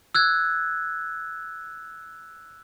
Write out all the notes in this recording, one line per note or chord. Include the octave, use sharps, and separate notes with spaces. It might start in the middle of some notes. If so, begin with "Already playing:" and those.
E6 F#6 G#6